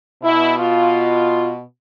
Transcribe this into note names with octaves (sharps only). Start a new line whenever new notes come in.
B2 E4
F4